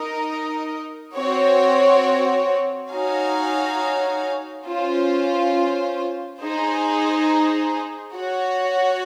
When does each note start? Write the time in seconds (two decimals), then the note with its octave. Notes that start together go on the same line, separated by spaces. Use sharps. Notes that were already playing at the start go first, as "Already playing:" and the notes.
Already playing: D#4 A#4 D#5
1.15 C4 F#4 C#5
2.90 D#4 F#4 C#5 F5 G#5
4.66 C#4 F4 C5
6.40 D#4 G#4 C5
8.14 F#4 C#5 F#5